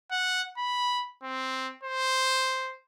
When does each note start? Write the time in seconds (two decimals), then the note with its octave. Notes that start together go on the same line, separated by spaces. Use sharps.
0.11 F#5
0.57 B5
1.23 C4
1.83 C5